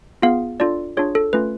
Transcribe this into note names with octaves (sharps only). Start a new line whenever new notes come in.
B3 F4 G#4 F5
D4 F4 A4 D5
D4 F4 G#4 C#5
A4
A3 C#4 F4 B4